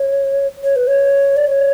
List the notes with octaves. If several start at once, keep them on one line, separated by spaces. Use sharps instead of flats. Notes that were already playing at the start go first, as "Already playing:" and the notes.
Already playing: C#5
C#5
B4
C#5
D5
C#5